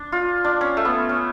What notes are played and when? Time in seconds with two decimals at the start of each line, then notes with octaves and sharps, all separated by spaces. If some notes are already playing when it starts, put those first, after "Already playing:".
Already playing: D4
0.12 F4
0.44 D4
0.61 C#4
0.77 A3
0.85 B3
1.09 C#4